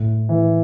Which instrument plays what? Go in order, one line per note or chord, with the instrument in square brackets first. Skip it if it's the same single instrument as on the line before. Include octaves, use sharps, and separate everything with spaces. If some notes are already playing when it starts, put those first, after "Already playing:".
Already playing: [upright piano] A2
E3